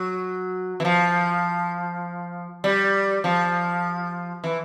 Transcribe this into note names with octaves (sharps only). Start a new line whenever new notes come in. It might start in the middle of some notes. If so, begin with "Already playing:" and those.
Already playing: F#3
E3
F3
G3
F3
E3